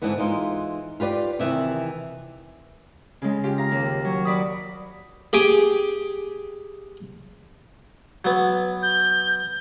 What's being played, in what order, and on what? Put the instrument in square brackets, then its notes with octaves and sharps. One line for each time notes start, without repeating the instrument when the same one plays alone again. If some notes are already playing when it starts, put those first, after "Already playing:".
[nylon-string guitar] G#2 D3 E3 G#3 B3
E3 G#3 D#4 F4
F4 G4 B4 D5
C3 D#3 E3 E5
[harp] C#3 G#3
F4 G4
F5 A#5
D#2
F#3
F#4 D5 B5 D#6
[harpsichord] G4 G#4 G#5 D6
F#3 B3
[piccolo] G6